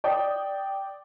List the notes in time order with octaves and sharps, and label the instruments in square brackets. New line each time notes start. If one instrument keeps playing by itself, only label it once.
[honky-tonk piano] D5 G5 D#6